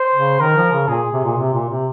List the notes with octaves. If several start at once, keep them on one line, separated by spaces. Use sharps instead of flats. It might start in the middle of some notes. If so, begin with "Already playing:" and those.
Already playing: C5
C#3
D#3 A#4
F3
C#3
A#2 G#4
C3
A#2
C3
A#2
C3